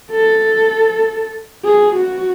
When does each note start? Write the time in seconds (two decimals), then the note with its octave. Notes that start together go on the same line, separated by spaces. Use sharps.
0.11 A4
1.65 G#4
1.95 F#4